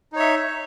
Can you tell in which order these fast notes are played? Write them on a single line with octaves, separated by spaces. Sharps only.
D#4 C#5 E5